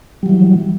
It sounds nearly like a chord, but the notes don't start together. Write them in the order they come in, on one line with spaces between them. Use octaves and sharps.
G3 F#3 E3